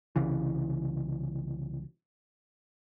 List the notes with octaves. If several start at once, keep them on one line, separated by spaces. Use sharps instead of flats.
C2 C#3 E3